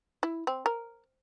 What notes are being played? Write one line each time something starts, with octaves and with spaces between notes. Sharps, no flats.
E4
C4
A#4